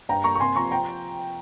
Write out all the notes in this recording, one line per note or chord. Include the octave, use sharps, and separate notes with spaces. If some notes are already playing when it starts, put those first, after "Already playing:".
G2 G5 A#5
A#3 A#5 C#6
C#6
C3 G#5 C6
F3 A#5 C#6
G5 A#5